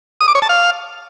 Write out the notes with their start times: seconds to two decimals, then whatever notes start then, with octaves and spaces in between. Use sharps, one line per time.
0.21 D#6
0.28 D6
0.35 C#5
0.42 A5
0.49 F5